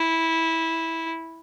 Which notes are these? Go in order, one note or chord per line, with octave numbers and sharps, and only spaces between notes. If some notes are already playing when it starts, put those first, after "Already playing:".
Already playing: E4